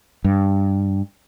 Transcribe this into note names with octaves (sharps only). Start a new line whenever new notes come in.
G2